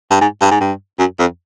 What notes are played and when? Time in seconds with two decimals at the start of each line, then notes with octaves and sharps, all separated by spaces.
0.11 G2
0.21 G#2
0.41 G2
0.51 G#2
0.61 G2
0.99 F#2
1.19 F2